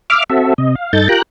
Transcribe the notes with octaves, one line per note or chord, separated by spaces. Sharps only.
E5 F5 D6 F6
C4 F#4 A4 E5
C3 D#5
F5
G2 D#4 A4 G6 A6
F4 G4 A#4 G5 A#5 F#6